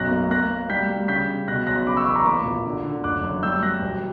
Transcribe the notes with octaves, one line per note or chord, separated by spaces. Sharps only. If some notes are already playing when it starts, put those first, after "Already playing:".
Already playing: B1 F#2 F#6 A#6
A#3
A#3 F#6 A#6
A#3
G3 G6 B6
G3
C#3 G6 B6
C#3
B2 F#6 A#6
B1 F#6 A#6
C#3 B5 D6
C#6 E6
E2 B5 D6
A#5 C#6
A#3 B5 D6
A#1
D3
D3
F#1 D6 F#6
F#2
G3 E6 G6
G3 F#6 A#6
E1